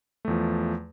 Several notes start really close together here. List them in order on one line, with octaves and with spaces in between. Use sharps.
A3 E2 F3